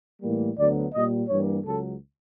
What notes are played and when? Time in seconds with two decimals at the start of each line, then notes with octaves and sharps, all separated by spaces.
0.21 A2 E3 G3 A#3
0.57 D2 D3 F#3 B3 D5
0.94 A#2 G3 A#3 D#5
1.29 G2 E3 G3 A#3 C#5
1.65 C#2 C#3 F#3 A4